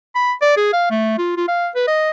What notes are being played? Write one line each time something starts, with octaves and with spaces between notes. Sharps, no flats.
B5
D5
G#4
F5
A3
F4
F4
F5
B4
D#5